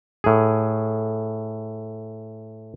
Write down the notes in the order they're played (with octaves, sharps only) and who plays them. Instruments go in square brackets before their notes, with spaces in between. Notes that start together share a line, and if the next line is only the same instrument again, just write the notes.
[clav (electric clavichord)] A2 G#4